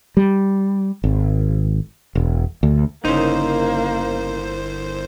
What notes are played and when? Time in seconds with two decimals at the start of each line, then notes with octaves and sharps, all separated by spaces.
0.17 G3
1.04 G#1
2.15 E1
2.63 D2
3.05 G1 C#3 A#3 D#4 E4 A#4 C5 C6